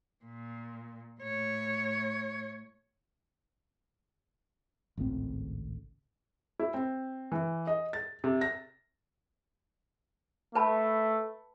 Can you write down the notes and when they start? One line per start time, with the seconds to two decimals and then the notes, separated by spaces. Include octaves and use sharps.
0.25 A#2
1.21 A2 C#5
4.97 G#1 C#2 A2 C4
6.60 E4
6.74 C4
7.32 E3
7.67 D#5
7.93 A6
8.24 C3
8.41 A#6
10.55 A3 B4 A5 B5